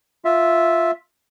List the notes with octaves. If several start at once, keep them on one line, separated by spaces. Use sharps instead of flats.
F4 E5